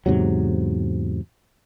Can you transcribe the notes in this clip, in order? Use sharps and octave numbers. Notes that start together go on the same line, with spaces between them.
E2 G#2 C3 F#3